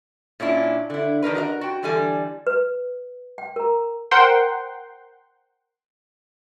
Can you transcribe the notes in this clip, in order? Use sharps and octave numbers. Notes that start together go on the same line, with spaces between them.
A#2 C#4 D4 E4
D3 E4
D#3 D4 A#4 B4
F#4 A#4 D#5 A#5
F#4 G5
D3 E3 G3 A4 G#5
B4
G5
A#4 A#5
A#4 C5 F#5 G5 C6